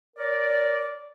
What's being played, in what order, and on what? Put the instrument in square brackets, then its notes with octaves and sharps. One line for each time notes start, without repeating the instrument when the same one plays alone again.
[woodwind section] A#4 C#5 D5